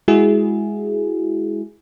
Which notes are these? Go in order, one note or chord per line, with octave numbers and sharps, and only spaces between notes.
G#3 E4 F#4 G#4